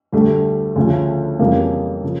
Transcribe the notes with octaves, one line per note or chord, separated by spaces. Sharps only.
D2 D3 G3 A3
D2 C#3 F3
F2 C#3 E3 G3 A#3
C#3 F3